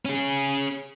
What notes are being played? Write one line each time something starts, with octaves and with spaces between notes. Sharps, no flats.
C#4 G#4